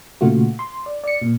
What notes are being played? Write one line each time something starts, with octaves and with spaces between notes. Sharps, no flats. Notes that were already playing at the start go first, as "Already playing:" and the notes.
A#2 C#3 A3 F4 F#4
C6
D5
D5 C#7
A#2